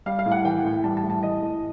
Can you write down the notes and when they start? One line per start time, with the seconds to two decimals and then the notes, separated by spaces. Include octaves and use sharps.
0.06 G3 F5
0.19 F5
0.26 A2
0.32 F#5
0.45 E3 G5
0.64 A2
0.84 G3 A5
0.97 A5
1.03 A2
1.10 A5
1.23 E3 D#5
1.42 A2